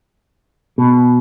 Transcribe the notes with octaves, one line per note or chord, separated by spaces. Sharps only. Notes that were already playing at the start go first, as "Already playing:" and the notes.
B2